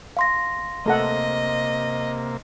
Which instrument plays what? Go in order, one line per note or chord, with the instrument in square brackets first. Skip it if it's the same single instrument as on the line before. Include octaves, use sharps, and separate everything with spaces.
[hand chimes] F5 C6 A#6
[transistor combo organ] C3 A#3 [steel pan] A3 A4 F#5 [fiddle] D#5